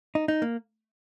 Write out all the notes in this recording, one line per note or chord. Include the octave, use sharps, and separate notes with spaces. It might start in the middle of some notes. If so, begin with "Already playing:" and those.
D#4
D#4
A#3